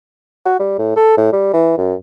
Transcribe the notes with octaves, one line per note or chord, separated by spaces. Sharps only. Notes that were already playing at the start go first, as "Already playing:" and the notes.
F#4
G3
A2
A4
A2
G3
E3
F#2